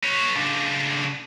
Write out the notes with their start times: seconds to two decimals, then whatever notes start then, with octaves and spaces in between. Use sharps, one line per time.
0.03 B4 C#5
0.36 C#3 D4